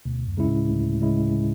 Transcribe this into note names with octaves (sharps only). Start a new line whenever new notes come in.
D2 B2
F#2
C#3 G#3 C#4 E4
A2
D2
C#3 G#3 C#4 E4